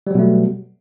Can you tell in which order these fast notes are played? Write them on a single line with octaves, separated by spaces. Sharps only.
G3 F#3 B2 A3